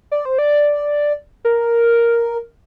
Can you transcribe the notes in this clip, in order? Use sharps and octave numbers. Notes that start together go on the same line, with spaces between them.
D5
C5
D5
A#4